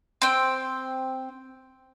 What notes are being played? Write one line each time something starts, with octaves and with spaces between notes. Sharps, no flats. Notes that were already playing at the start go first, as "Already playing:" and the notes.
C4 G5